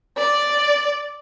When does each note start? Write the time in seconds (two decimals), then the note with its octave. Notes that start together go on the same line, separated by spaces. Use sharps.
0.18 D5